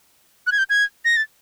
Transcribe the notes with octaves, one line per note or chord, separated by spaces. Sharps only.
F#6
G#6
G6
G#6
A#6
A6